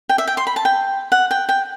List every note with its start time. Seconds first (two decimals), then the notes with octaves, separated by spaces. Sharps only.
0.09 G5
0.18 E5
0.27 G5
0.37 C6
0.47 B5
0.56 A5
0.65 G5
1.12 F#5
1.31 G5
1.49 G5